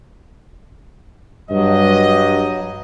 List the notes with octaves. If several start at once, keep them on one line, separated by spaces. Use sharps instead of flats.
G2 F#3 D#5